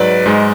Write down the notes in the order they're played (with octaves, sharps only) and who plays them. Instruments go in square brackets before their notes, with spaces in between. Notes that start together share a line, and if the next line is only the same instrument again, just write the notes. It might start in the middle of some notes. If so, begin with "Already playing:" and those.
Already playing: [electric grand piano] G#2 F#3 B4 D5
G#2 G#3